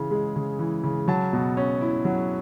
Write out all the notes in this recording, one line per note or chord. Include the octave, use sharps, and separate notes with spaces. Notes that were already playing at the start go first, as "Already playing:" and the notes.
Already playing: C#3 E3
G#3
C#3
E3
C#3
F#3 A5
B2
C#4
E4
F#3